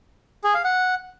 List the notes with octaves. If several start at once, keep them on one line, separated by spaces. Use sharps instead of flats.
G#4
F5
F#5